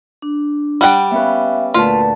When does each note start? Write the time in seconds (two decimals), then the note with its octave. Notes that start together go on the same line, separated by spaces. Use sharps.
0.22 D4
0.81 G3 F#5 G5
1.11 B3 C#4 B4 E5 F5
1.74 D2 A#2 F4 B4 A5